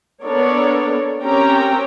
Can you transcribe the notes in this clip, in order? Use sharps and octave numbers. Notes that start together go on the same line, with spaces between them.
B3 D4 A4 A#4 C#5 D5
C4 C#4 G4 A#4 G5 A#5